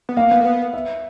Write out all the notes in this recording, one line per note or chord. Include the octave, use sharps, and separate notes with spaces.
B3
A#3 F5
B3
A#3
B3
E5